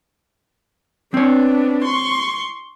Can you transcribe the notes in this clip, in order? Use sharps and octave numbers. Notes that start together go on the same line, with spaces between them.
B3 C4 D4 C#5
C6 C#6